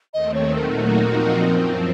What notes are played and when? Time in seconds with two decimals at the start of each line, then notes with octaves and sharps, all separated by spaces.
0.14 D#2 D#3 A3 C4 D#5
0.34 C#5
0.55 A#2 F#3 A3 D#4 F#4 A#4
0.97 A#2 F3 C4 D#4 F#4
1.39 F#2 F3 C4